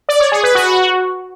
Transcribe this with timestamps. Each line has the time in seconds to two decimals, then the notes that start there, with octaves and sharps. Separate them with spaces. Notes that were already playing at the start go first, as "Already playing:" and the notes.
0.09 D5
0.20 C#5
0.32 G#4
0.43 B4
0.55 F#4